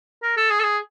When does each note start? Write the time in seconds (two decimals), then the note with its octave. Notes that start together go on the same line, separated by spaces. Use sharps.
0.23 A#4
0.37 A4
0.50 G#4
0.60 A4
0.63 G#4